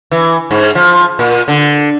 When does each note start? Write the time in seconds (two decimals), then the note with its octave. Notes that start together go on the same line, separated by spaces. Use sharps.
0.11 E3
0.51 G#2
0.75 F3
1.19 A#2
1.48 D3